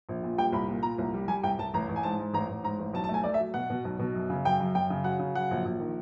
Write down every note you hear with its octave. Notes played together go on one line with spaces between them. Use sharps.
A#1
A#2
G3 G5
C2 B5
A#2
A#2 A#5
C2
G3
G3 G#5
C2 G5
C2 A5
A1 A#5
A1
G#5
G#2 A5
G#2
A1 A#5
A1
G#2 A#5
A1
B1 A5
A5
A3 G#5
A3 D5
E5
F#3
B2 F#5
B2
B1
B2
F#2
C#3
F#2 G5
F#2
F#2 G5
C#3
F#3 F#5
C#3
F#3 F#5
A#1
A#1
D#3